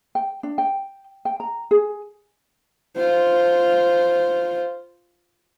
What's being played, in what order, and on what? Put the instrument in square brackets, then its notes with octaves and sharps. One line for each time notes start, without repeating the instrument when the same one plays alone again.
[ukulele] G5
D4
G5
G5
A#5
G#4
[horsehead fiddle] F4 C5